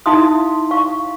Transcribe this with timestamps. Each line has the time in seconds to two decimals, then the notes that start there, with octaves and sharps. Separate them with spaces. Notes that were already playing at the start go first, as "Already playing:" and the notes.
0.06 D#4 E4 E5 F5 C6 D#6
0.71 F5 C#6